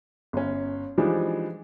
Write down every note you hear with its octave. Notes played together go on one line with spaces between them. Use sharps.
G1 C#4
E3 F3 G3 G#3 D4 D#4